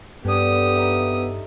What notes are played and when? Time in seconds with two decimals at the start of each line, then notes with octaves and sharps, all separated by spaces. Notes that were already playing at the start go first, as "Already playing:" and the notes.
0.25 G2 B3 D4 G4 A4 D#6
0.75 D#4 E5